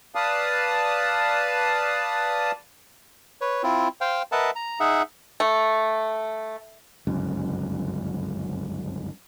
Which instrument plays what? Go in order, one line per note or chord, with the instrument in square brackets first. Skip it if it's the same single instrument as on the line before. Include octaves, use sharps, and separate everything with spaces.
[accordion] B4 D5 F5 A5 D#6
[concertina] B4 C#5
C4 E4 F4
C5 F5 G5
A#4 B4 D#5 E5 F#5 A5
A#5
D#4 G#4 E5 F#5
[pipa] A3
[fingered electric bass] G1 C#2 F#2